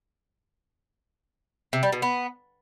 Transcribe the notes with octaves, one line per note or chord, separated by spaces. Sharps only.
C3
G3
B2
B3